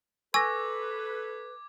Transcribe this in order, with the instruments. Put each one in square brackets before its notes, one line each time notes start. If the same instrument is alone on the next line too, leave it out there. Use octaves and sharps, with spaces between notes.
[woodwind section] A4 B4 [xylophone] G#5 E6 [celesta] C#6 A#6 [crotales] D6 G#6